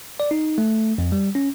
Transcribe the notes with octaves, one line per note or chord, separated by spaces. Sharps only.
D5
D#4
A3
F2
G3
C#4